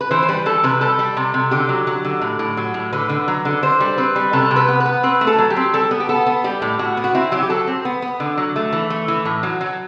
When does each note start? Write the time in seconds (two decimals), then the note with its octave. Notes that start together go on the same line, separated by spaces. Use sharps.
0.01 B4
0.11 E3 C5
0.23 C5
0.28 G3 B4
0.46 E3 A4
0.64 C3 B4
0.81 G3 A4
0.99 G3
1.17 C3
1.34 C3
1.51 D3 G4
1.69 F#3
1.87 F#3
2.05 D3
2.21 A2
2.39 A2
2.57 F#3
2.74 A2
2.93 D3 B4
3.09 D3
3.28 F#3
3.45 D3
3.63 D3 C5
3.80 G3
3.98 C4 B4
4.16 G3
4.33 C3 A4
4.51 C3
4.56 B4
4.69 B3
4.80 B4
4.85 B3
5.03 C4 B4
5.21 A3
5.27 A4
5.39 F#3
5.50 G4
5.56 C4
5.74 G3 A4
5.91 B3
6.00 G4
6.09 B3 A4
6.26 B3
6.44 G3 G4
6.62 A2
6.79 A2 F#4
6.97 B3
7.04 F#4
7.15 C4 E4
7.32 F#3 G4
7.42 G4
7.50 F#3 A4
7.67 C4
7.85 B3
8.02 B3
8.20 D3
8.38 F#3
8.56 A3
8.73 E3
8.90 A3
9.08 E3
9.25 A2
9.43 F#3
9.61 F#3